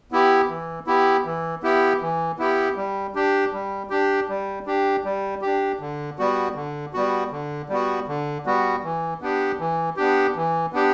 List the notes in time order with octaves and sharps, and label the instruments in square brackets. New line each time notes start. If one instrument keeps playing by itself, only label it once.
[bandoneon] B3 E4 G4
E3
B3 E4 G4
E3
B3 E4 G4
E3
B3 E4 G4
G3
D4 G4
G3
D4 G4
G3
D4 G4
G3
D4 G4
D3
G3 B3 F#4
D3
G3 B3 F#4
D3
G3 B3 F#4
D3
G3 B3 F#4
E3
B3 D4 G4
E3
B3 D4 G4
E3
B3 D4 G4